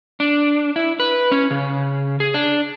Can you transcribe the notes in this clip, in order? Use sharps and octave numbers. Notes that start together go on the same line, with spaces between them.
D4
E4
B4
C#4
C#3
G#4
D4